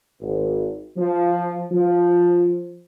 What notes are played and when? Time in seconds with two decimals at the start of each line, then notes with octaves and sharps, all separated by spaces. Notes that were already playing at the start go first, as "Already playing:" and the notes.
0.20 G#1
0.96 F3
1.72 F3